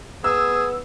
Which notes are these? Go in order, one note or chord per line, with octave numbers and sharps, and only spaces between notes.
B3 G#4 E6